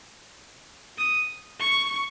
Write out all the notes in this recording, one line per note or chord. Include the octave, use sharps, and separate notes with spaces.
D#6
C#6